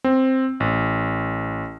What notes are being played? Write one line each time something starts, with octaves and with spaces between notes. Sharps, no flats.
C4
A1